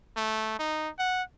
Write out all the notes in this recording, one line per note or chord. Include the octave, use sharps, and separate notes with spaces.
A3
D#4
F#5